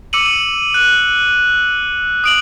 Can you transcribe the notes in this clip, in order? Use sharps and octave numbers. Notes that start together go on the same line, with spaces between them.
D6 E6 C#7 D#7 F#7
F#6
D#6 D7 F#7